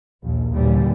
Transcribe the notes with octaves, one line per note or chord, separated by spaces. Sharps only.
A#1 D#2
A#1 D#2 A#2 D3 E3 G3